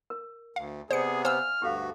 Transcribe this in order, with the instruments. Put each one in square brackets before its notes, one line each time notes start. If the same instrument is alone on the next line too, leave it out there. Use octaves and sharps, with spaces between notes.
[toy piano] A#4
[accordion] D2 [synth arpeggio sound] F5
[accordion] C3 B3 [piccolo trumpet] G#4 [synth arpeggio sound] C5 C#7 [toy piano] D5
[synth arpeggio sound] C5 E6 [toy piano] F5 G#5 [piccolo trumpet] F6
[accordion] D2 G2 F#4 [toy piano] G4 A4 F5